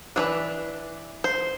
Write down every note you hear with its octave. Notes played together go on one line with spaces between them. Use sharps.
E3 A3 D4 B4
C5